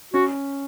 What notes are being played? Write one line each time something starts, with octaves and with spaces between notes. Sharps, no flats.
C#4 F#4